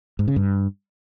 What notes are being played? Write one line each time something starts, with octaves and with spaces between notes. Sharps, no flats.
G#2
C#3
G2